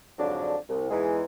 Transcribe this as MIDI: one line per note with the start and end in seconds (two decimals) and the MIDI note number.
0.19 0.55 41
0.19 0.55 44
0.19 0.55 50
0.19 0.55 53
0.19 0.55 54
0.19 0.55 62
0.69 0.90 36
0.91 1.23 40
0.91 1.23 52
0.91 1.23 56
0.91 1.23 63